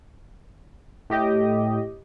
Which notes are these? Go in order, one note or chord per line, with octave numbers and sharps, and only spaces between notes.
A2 G4 D#5